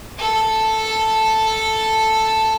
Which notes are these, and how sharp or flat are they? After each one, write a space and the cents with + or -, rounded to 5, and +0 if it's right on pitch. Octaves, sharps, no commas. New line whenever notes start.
A4 +0 A5 +0